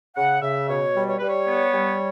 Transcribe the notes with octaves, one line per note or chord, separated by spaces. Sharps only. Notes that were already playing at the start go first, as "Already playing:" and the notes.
C#3 F#5
C#3 E5
B2 C#5
G3
C#5
G3 B4
C#5
B3
G3